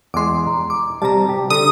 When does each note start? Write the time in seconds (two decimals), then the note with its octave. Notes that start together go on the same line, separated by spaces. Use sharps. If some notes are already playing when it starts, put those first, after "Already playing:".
0.14 E2 G#3 C6 D6
0.47 A#5
0.70 D6
1.02 C3 G3 A5 A#5
1.29 G4
1.50 D3 D#6